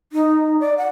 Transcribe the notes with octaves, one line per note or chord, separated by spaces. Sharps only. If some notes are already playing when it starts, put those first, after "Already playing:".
D#4
D5
F#5